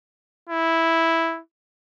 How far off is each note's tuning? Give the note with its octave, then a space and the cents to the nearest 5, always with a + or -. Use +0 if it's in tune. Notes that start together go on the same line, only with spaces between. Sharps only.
E4 -5